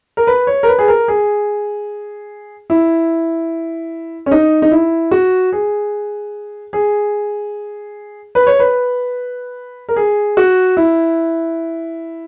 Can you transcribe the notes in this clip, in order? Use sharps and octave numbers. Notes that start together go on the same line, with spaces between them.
A#4
B4
C#5
A#4
B4
G#4
A#4
G#4
E4
C#4
D#4
D#4
E4
F#4
G#4
G#4
B4
C#5
B4
A#4
G#4
F#4
E4